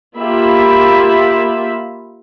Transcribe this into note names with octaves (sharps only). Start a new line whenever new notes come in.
A#3 F4 G4 E5 B5